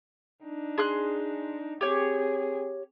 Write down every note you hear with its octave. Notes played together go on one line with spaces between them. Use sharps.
D4 D#4
G#4 C6 F#6
C4 G4 G#4 C#5